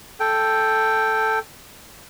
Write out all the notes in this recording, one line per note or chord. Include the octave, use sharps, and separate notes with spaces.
A4 G5